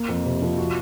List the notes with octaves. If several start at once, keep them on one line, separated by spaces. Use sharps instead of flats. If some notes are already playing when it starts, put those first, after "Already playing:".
Already playing: A#3
F2
C3
F3
F#4